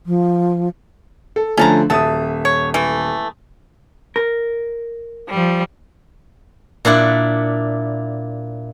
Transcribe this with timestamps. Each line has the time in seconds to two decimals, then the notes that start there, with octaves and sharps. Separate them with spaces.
0.05 F3
1.36 A4
1.57 D3 F3 A3 C#4 A5 A#5
1.90 D#1 F#3 E5 A5 D#6
2.45 C#5
2.74 E3 A3
4.16 A#4
5.30 F3 G3
6.85 A#2 D4 E4 D5 F#5